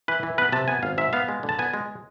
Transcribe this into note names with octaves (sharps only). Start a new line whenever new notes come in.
E3 B4
E3
B3 B4
C3 A5
B3 G#5
G#1 F5
G#2 E5
B3 F5
G#3
D3
A5
B3 G#5
G#3